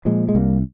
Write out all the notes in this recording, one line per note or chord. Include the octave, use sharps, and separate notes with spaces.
A#2 F3 G#3
G#3
C2 G3 A#3